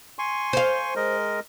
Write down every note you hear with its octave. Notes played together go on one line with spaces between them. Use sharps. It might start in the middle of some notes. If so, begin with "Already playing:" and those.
G#5 C6 C#6
C5 F5
G#3 A#4 D#5